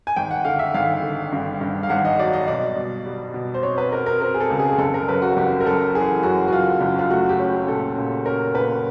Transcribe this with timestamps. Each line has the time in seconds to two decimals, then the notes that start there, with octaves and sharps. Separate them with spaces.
0.07 G#5
0.16 G#1 G5
0.31 F#5
0.45 D3 F5
0.59 E5
0.74 G#1 F5
1.02 D3
1.32 G2
1.61 G2
1.83 F5
1.89 G#1 F#5
2.05 D#5
2.19 F#3 D5
2.33 D#5
2.48 B2 D5
2.76 B2
3.06 G3
3.34 B2
3.54 C5
3.63 C4 C#5
3.78 B4
3.92 C4 A#4
4.06 A#4
4.21 C4 A#4
4.34 G#4
4.40 A4
4.50 C#2
4.59 G#4
4.78 F#1 A4
4.94 A#4
5.09 F#2 B4
5.22 F#4
5.37 F#1 G4
5.61 A#4
5.65 F#2 A4
5.95 E3 G#4
6.23 F#2 F#4
6.48 F#4
6.52 F#2 F4
6.81 F#1
6.99 F4
7.10 A3 F#4
7.29 G4
7.39 C#4
7.49 G4
7.68 A#2 A4
7.98 A#2
8.26 C#4 A#4
8.55 A#2 B4